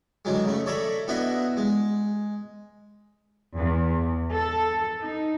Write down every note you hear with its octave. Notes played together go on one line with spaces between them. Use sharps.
D3 D#3 F#3 G#3
C#3 A3
A4 C#5 D5 E5 A#5 B5
B3 D4 E4 F#4 D#5 E5
G#3
E2
A4
D#4